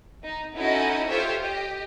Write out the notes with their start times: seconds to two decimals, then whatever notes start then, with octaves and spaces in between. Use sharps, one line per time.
0.23 D#4
0.55 C#4 D#4 E4 F#4 A4 D#5
1.09 F4 G4 A4 C5 C#5 E5
1.39 G4 D#5